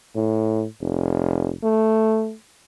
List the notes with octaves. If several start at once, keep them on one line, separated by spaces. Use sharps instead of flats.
A2
F1
A3